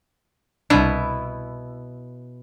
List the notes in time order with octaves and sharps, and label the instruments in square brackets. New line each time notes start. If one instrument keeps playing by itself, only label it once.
[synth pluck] C2 D4 [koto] B2 B3 E4